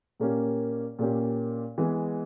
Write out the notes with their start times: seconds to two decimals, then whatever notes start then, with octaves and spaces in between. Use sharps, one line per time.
0.20 A#2 A#3 C#4 G4
0.99 A#2 A#3 C#4 G4
1.78 E3 G#3 B3